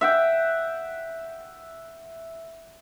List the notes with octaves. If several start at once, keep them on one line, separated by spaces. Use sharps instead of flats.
E5 F#5 G5